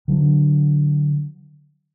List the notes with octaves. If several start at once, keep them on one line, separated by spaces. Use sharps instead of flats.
D3 F#3 D4